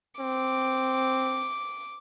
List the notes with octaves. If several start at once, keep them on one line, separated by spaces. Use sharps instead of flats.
C4 D6